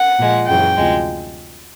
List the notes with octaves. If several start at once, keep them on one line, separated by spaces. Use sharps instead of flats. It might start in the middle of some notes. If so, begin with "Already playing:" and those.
Already playing: F#5
A#2 F3 G#3
F#2 C#3 E3 G5
D2 C3 F3 G#3